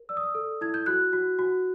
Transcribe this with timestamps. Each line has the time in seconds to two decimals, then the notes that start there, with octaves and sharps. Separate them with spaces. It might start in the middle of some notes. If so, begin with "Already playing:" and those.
Already playing: A#4
0.09 D5 E6
0.17 D#6
0.23 E6
0.35 A4
0.61 E4 G#6
0.74 G6
0.86 F#4 F#6
1.13 F#4
1.39 F#4